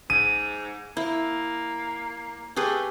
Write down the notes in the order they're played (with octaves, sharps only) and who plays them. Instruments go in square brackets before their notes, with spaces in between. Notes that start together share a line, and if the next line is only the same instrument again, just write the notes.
[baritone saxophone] G#2 [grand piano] D#7
[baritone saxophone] A#3 [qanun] E4
[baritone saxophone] A3 [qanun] G4 G#4 B4